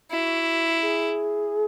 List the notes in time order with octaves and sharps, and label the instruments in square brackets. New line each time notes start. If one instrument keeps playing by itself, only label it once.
[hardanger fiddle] E4 [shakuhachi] F#4
[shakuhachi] G#4